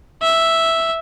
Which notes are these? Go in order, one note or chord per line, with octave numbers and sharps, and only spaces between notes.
E5